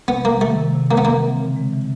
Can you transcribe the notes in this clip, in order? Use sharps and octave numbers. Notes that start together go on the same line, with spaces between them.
C3 B3
G3 A#3
D#3 A3
C3
C3
G#3 A#3
B3
E3 A#3
C4
C#3
G#3
E3